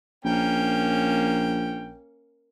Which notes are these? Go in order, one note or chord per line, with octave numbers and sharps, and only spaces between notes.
A#1 A#3 C#4 G5